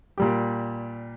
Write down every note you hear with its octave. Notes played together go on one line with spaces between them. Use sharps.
A#2 G3 G4